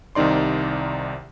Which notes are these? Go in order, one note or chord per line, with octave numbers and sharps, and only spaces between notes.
C2 C3 D#3 D#4 D5 C6